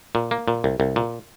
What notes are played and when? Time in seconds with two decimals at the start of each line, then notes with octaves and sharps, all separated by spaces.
0.15 A#2
0.31 A#3
0.48 A#2
0.64 C2
0.80 C2
0.96 A#2